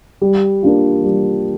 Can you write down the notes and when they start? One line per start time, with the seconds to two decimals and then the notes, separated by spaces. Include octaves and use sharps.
0.21 G3
0.63 A#3 D4 F4
1.04 G3